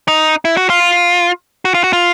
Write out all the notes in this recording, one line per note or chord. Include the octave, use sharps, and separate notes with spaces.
D#4
E4
F#4
F4
F#4
F4
F#4
F4